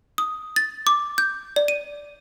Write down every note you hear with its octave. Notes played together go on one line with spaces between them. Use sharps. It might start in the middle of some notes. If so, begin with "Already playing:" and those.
D#6
A6
D6
G6
D5
D#7